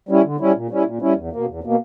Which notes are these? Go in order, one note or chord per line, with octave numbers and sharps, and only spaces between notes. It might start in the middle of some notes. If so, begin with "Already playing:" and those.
G3 C#4 E4
D3
G3 C#4 E4
A#2
G3 C#4 E4
A#2
G3 C#4 E4
E2
B2 A#3
E2
B2 A#3